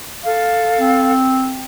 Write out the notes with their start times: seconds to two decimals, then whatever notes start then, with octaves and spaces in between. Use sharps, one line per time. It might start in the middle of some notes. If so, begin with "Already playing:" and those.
0.23 A4 F5
0.79 C4